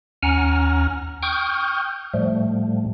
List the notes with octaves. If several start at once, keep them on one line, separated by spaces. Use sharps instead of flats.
D#2 C#4 F#5 G#5 A#5 F6
G5 C#6 D#6 F6 G6
A2 F3 G3 A3